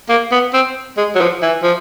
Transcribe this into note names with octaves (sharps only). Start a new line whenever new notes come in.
A#3
B3
C4
G#3
F#3
F3
E3
F3